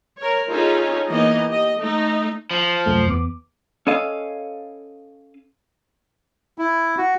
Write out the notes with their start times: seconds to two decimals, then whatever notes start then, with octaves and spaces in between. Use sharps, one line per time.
0.18 A#4 C#5
0.50 C#4 D#4 F4 G#4 A4 C#5
1.10 E3 A#3 B3 D#4 D#5
1.48 G4 D#5
1.79 A3 D#4
2.51 F3
2.86 C2 F#2 A3
3.07 E2 B3 D6
3.87 C#4 A4 D#5 F5
6.58 E4
6.98 F#4